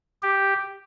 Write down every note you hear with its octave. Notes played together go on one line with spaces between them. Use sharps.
G4